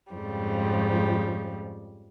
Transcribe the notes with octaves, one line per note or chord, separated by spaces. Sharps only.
F2 G#2 C#3 F3 G3